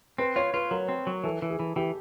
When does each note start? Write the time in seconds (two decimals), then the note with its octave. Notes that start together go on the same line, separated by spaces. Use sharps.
0.18 C4 B4
0.36 F4 C#5
0.54 F4 B4
0.71 F#3 A#4
0.89 C4
1.07 F#3
1.24 E3 A4
1.42 E3
1.50 G#4
1.59 E3
1.76 E3 G4